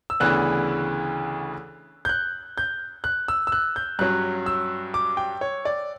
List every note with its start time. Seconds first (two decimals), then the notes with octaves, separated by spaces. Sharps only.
0.10 E6
0.20 D2 C#3 E3 B3 D4 F#6
2.05 G6
2.09 F#6
2.58 G6
3.04 F#6
3.28 E6
3.47 E6
3.52 F#6
3.76 G6
3.99 G2 F#3 C#4 F#6
4.46 E6
4.94 D6
5.17 G5
5.41 C#5
5.65 D5